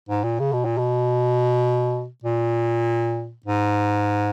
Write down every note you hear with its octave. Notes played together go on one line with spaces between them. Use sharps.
G#2
A#2
C#3
B2
A#2
B2
A#2
G#2